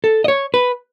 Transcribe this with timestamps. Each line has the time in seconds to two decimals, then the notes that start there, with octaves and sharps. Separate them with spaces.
0.04 A4
0.24 D#5
0.28 C#5
0.54 B4